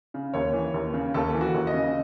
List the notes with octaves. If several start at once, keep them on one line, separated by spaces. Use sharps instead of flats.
C#3
D#2 C#5
E3
D#2
C#3
D#2 A4
E3
F#4
D#2
D#5
C#3